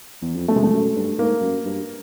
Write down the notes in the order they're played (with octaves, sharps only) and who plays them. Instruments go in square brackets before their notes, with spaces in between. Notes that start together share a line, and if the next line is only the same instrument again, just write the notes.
[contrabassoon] E2
F2
[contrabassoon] F#2 [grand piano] A3
[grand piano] G#3
[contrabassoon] F2 [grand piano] A3
[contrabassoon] F#2
G2
[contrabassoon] G#2 [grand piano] A#3
[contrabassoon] F#2
G2